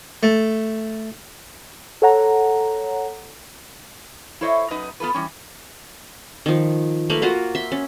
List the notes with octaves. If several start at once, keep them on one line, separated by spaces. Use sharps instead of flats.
A3
A4 C#5 F#5 A#5
E4 A4 C5 C#5 D#5 E5
F#2 D#4 B4 D#5
B3 F4 A4 B4
E3 G3 C#4
D#3 F3
A3 A#3 B4
A#3 F4 F#4
E5 C6
C#4